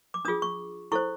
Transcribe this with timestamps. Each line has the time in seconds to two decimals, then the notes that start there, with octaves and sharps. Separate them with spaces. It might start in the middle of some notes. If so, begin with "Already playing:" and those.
0.14 D6
0.25 D4 D#6
0.28 F4 G#4
0.42 C#6
0.92 E4 A4 C5 C#6